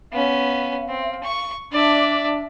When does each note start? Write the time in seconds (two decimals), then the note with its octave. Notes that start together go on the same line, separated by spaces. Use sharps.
0.12 B3 C#4 F5
0.88 C4
1.24 C#6
1.72 D4 D5 E5